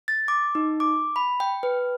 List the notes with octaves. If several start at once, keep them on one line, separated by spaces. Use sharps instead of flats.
A6
D6
D#4
D6
B5
G5
B4